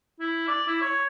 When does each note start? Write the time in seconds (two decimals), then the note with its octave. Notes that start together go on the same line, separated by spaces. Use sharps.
0.20 E4
0.48 D5
0.67 E4
0.82 C#5